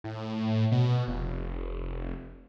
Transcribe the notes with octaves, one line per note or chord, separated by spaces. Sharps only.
A2
B2
F1